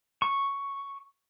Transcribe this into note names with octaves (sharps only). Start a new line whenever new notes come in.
C#6